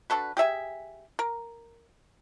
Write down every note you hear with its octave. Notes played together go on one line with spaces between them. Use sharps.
D4 F#4 A4 B4
G4 G#4 E5 G#5
A#4